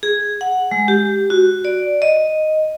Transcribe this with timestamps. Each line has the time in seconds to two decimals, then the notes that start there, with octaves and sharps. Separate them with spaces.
0.03 G#4
0.41 F#5
0.71 G#3
0.88 G4
1.30 F#4
1.65 D5
2.02 D#5